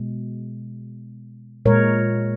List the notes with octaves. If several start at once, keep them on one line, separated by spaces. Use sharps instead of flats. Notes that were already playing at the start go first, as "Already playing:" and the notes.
Already playing: B2 G#3
A#2 G#3 A#4 C#5